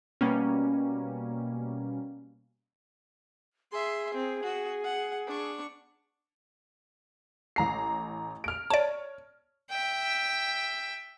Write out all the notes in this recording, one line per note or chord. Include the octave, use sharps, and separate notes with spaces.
B2 G3 A#3 C#4
G#4 E5 C6
C4
F#4
F#5
D4 C#6
A1 A#5 C7
F6 D7
C#5 D5 A5
E5 G5